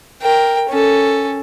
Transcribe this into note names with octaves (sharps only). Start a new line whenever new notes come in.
A#4 G5
C#4 A4